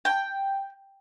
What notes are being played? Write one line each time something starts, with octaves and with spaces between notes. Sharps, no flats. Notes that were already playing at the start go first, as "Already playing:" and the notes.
G5